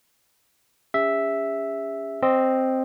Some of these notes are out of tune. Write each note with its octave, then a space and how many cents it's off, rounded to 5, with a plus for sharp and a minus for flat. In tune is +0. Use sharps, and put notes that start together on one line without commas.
C#4 +20 G#4 -45 E5 +0
C4 +0 D#5 -10